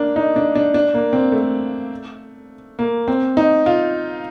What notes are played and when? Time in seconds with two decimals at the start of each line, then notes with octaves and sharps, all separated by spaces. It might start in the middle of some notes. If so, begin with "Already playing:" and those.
Already playing: A#3 D4
0.16 D#4
0.36 D4
0.55 D4
0.74 D4
0.94 A#3
1.13 C4
1.32 A3
2.79 A#3
3.08 C4
3.37 D#4
3.66 F4